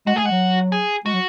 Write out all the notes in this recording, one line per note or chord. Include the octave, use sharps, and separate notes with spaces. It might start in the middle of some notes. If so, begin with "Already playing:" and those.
G#3 F#4
A3 G#4
G#3 F#4
F#3
G#4
G#3 F#4
F#3